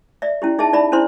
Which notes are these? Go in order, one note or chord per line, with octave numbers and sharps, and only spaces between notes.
D5 E5
C#4 E4 G4
D#4 G#4 D#5 E5 A5
D#4 D5 E5 B5
C#4 D4 E4 C5 C6